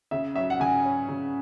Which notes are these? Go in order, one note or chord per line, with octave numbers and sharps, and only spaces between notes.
C#3 E5
F#3 E5
F#5
C#3 G#5
C#4
C#3